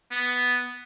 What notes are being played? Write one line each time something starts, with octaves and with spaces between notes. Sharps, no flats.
B3